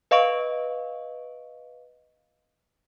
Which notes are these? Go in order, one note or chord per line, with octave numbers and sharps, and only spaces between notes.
B4 D#5 F5 C#6 D7